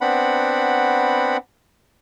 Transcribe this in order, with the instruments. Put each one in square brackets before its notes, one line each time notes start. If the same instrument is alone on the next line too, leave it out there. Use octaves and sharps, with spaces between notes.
[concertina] B3 C4 D4 F#5 B5